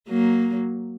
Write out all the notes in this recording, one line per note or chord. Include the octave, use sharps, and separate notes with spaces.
F#3 A#3